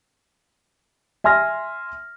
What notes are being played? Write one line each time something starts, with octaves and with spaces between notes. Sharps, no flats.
E5 G#5 C6 F6 A#6